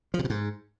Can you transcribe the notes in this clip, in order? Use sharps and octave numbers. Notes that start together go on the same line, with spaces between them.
F3
C3
B2
G#2